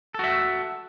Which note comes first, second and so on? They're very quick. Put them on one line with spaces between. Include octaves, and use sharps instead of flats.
A4 F#4 E5